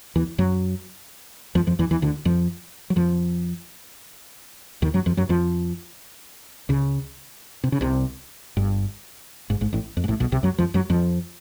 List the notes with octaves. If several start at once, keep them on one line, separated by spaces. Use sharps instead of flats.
E2 E3
F#2 F#3
F2 F3
F2 F3
E2 E3
E2 E3
D2 D3
F2 F3
F#3
F2 F3
D#2 D#3
F#2 F#3
F2 F3
F#2 F#3
F2 F3
C#2 C#3
C3
C#3
C2 C3
G1 G2
G#1 G#2
G#1 G#2
A1 A2
F2
G#2
A1 A2
B1 B2
C2 C3
F#2 F#3
F2 F3
F#2 F#3
F2 F3